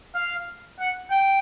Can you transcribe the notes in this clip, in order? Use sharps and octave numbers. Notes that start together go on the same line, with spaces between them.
F5
F#5
G5